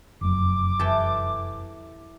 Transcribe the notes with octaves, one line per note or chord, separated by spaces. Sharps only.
F1 F#2 D6
E3 G4 A4